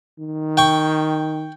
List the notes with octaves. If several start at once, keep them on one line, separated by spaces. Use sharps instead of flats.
D#3
G5 C#6